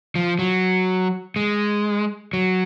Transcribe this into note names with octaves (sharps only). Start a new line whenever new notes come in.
F3
F#3
G#3
F#3